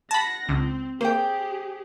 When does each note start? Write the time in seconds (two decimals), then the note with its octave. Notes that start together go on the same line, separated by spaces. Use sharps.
0.11 F#5 A5 B5 A#6
0.49 C#2 C4
1.01 A#3 G4 G#4 C5 G5